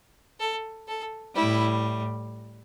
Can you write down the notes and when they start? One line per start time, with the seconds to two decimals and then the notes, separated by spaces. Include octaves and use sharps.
0.40 A4
0.88 A4
1.35 A2 G3 E4